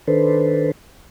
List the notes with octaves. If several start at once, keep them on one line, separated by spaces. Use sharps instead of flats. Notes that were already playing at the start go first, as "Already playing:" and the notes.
D#3 D4 A4 B4 C5